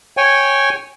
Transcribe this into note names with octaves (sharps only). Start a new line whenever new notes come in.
C#5 G5 G#5